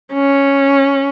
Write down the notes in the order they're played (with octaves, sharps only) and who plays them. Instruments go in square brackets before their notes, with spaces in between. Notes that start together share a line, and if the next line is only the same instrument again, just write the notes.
[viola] C#4